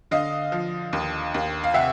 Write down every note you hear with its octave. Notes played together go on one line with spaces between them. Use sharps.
D3 D#5 F5
F3
D#2
D#2
F5
C3 E5 F#5